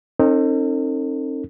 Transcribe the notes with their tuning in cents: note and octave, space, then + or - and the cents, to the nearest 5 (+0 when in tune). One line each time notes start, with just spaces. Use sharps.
C4 +45 D#4 -10 A4 +45